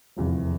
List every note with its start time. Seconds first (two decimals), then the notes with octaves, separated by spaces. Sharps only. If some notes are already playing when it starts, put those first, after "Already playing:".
0.16 F1 E2 C3 F3